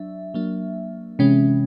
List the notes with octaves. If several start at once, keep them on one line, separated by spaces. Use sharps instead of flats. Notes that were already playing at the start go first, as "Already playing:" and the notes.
Already playing: F#3 D4 E5
F#3 A#3 D4
C3 E3 G#3 C#4